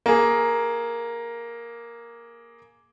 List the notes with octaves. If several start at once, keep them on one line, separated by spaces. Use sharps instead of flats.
A#3 G#4